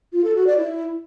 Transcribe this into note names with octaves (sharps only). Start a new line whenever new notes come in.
F4
A4
F#4
D5
E4